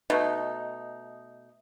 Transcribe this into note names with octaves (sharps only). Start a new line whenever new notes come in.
B2 A3 D#4